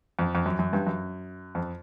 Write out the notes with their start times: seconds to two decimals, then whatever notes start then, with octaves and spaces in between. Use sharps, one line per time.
0.19 F2
0.35 F2
0.46 F#2
0.59 F#2
0.73 G2
0.87 F#2
1.55 F2